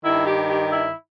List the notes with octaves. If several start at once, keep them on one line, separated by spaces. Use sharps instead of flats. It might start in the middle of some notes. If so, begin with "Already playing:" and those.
G2 D#3 E4
G4
G4
E4